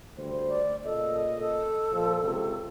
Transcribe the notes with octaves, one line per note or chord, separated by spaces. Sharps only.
D2 G3 C5
D5
A#2 C#3 A4 D#5
A4
A#2 F3
C#2 C3